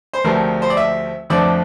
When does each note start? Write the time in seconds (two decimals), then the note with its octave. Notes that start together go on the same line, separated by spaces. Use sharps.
0.13 C5
0.24 D2 C3 F3 A3 C4 A#4
0.62 C5
0.70 D5
0.77 E5
1.30 F2 D3 F3 A3 C4 D5